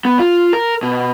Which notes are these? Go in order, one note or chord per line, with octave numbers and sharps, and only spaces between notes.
B3
F4
A#4
B2